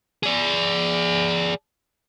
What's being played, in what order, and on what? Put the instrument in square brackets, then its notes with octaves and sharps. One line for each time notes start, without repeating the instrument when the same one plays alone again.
[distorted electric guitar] G#4 D5